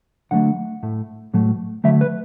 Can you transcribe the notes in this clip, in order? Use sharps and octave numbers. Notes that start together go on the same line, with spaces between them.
D3 F#3 A3 F#5
A2 A3
A2 F#3 A3
D3 F#3 A3 E5
B4